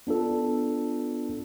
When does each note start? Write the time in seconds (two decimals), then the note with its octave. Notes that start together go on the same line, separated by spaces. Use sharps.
0.07 B3 D4 F4 A4